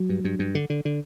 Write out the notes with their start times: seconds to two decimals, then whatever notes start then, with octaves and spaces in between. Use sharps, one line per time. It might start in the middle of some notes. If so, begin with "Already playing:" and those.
Already playing: F#3
0.09 G2
0.25 G2
0.39 G2
0.55 D3
0.70 D3
0.85 D3